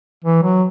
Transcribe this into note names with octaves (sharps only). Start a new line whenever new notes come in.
E3
F#3